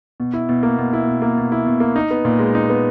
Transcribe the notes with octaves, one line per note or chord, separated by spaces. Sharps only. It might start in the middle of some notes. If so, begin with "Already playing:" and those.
B2
E4
B2
A#3
B2
E4
B2
A#3
B2
E4
B2
A#3
D#4
B3
A#2
G#3
D#4
B3